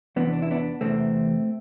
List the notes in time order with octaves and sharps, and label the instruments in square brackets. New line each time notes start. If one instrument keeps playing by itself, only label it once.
[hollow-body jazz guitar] E2 C3 E3 B3 D4
D4
E4
B3 D4
E2 C3 E3 A3 C4